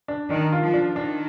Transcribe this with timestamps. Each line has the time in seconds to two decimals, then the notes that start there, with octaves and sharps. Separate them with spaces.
0.08 D4
0.30 D#3 D4
0.52 F4
0.63 F3
0.74 D4
0.95 D#3 D4